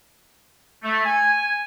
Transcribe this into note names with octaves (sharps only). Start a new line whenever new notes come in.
A3
G#5